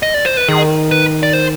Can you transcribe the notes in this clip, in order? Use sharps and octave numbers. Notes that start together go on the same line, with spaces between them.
D#5
D5
C5
B4
D#3 G#4
B4
D5
C5